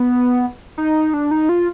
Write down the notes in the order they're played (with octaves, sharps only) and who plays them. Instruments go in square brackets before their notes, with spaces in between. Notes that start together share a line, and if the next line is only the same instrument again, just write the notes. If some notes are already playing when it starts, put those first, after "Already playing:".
Already playing: [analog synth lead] B3
D#4
D4
D#4
F4